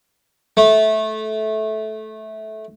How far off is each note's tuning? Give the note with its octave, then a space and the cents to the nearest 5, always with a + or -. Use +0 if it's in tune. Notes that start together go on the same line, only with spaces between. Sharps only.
A3 -15